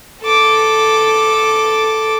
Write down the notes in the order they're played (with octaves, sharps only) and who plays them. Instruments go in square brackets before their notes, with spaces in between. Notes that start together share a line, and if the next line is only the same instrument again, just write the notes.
[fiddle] A4 D6